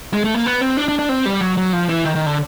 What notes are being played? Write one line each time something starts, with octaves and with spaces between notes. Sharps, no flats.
G#3
A3
A#3
B3
C4
D4
D4
D4
C4
G3
F#3
F#3
F3
E3
D#3
D#3
D3